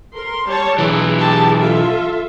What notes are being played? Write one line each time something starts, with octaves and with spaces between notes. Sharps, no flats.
A#4 C6
G3 C#5 A5
B1 E3 G#4
G4 G#4 A5
F4 A4 E5